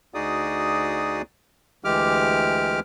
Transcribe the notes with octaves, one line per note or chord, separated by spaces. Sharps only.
D2 D#4 F#4 G#4 D5 D#6
D2 E3 G#3 G4 D6 F6